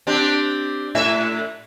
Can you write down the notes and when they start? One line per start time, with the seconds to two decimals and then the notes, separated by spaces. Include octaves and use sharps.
0.07 C4 D4 G4
0.95 A2 E5